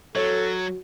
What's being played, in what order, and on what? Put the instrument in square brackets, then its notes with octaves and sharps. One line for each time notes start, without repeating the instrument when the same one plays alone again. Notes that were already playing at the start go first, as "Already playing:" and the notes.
[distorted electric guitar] F#3 [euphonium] F#4 [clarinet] A4 [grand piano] C#5